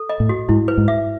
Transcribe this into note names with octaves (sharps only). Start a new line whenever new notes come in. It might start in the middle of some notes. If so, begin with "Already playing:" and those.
Already playing: A4
D#5
A2
F#4
G#2 E4
B4
G#2
E5